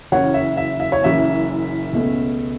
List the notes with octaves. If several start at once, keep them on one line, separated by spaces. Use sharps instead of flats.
F#1 F#2 E3 C#4 C#5 F#5
E5
E5
E5
C#5
F#1 F#2 E3 C#4 E5
C#2 B2 A3 C#4